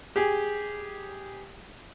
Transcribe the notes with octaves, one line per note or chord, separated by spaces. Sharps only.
G4 G#4